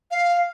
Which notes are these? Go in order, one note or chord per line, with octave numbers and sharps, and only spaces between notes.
F5